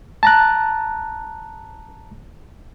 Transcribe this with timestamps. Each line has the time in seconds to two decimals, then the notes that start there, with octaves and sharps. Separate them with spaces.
0.23 A5 A#5 F#6